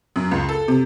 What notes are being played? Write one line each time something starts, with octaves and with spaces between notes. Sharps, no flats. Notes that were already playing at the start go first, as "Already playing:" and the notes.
F#2
C#2
A4
C3